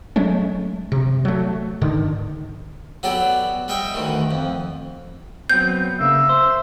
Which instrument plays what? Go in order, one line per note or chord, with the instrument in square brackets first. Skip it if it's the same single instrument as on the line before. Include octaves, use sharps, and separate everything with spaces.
[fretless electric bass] F#3 G#3 A3 C#4
C3
F#3 A3
G#2 D3 D#3
[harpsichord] F#3 B3 F#4 G4 A4 D5
G3 D#5 E5 G5
D2 D#3 E3
F2
[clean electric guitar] F#3 B3 C4 [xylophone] G6
[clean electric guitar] C#3 A#3 [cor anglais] E5
[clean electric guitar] C5